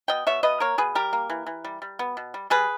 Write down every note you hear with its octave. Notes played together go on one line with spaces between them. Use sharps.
B2 D#5 G5
B2 C#5 E5
B2 B4 D#5
A#3 A#4 C#5
B2 G#4 B4
G3 G4 A#4
A#3
E3
E3
G3
G3
B3
B2
G3
G3 G#4 B4